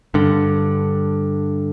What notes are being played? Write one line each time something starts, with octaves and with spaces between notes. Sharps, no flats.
G2 D3